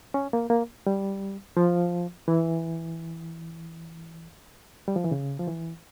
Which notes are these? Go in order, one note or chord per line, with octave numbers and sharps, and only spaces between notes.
C#4
A#3
A#3
G3
F3
E3
G3
F3
E3
C#3
F3
E3